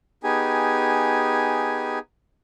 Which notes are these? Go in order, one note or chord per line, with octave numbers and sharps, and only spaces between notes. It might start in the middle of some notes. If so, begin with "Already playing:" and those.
B3 D#4 G4 G#4 G#5